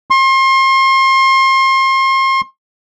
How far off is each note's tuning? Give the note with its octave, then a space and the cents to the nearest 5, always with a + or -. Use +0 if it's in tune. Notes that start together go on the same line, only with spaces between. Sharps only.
C6 +35